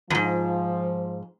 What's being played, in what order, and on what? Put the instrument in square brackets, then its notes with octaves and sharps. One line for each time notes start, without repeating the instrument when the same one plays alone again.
[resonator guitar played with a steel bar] E2 G#2 [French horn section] F3